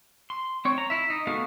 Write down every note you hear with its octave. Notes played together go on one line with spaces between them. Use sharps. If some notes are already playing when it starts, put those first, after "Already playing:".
C6
C4 C#5
A#5
E4 E5
D#4
A3 B3 F#4 G#4 F5